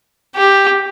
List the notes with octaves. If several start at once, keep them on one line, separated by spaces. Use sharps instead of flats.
G4